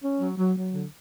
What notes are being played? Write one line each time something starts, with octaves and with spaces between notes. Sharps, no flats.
C#4
F#3
F#3
F#3
D3